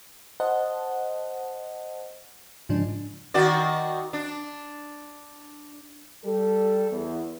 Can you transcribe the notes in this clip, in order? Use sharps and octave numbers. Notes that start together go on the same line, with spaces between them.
C5 D#5 F#5 A5
G#2 C#3 F3 D4
D#3 F#4 D5
D4
G3 A4
E2